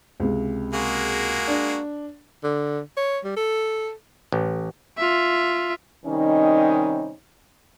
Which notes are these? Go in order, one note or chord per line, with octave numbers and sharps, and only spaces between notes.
C#2 C3
G#3 A#3 F#4
D4
D3
C#5
G3
A4
A1
F4 E5
C3 D#3 G3 C#4 D#4